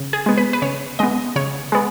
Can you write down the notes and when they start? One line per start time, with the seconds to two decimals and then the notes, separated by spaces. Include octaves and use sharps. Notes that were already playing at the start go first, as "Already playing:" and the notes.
Already playing: C#3
0.13 G#4
0.26 G#3 B3
0.37 B4
0.53 B4
0.62 C#3 C#5
0.99 G#3 B3 D#5
1.36 C#3 C#5
1.72 G#3 B3